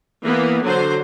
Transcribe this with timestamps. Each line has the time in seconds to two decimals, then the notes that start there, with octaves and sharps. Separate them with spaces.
0.24 E3 A#3 B3
0.64 D3 F#3 C5